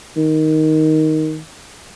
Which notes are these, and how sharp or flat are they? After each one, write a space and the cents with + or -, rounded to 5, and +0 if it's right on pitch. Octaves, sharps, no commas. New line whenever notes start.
D#3 +10